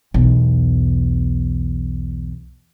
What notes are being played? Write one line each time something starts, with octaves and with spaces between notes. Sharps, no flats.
B1 E2